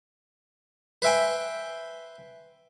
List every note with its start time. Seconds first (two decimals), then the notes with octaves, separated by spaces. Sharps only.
1.02 B4 C5 E5 G5 G#5